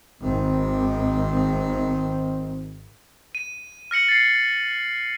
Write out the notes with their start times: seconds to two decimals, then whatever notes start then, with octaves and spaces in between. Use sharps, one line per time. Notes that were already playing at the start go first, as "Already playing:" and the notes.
0.22 G#1 D#3 C4
3.35 D#7
3.91 F6 A#6 C#7 F#7
4.08 A6 C7